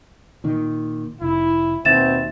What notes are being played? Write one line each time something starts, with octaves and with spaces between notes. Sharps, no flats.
A#2 D#3
F1 E4
D#2 B2 C4 E5 A6 E7